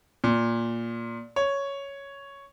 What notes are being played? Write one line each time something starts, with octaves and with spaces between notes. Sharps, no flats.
A#2
C#5